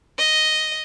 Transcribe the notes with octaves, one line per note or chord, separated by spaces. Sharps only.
D#5